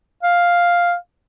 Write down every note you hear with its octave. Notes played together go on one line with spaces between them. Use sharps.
F5